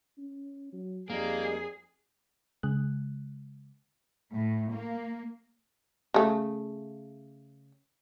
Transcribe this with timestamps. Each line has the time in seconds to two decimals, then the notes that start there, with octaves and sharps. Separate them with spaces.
0.18 C#4
0.73 F#3
1.10 F2 G3 A#3 D#4 G#4 A#4
2.63 C#3 G#3 F#6
4.33 A2
4.71 A#3
6.14 C#3 A3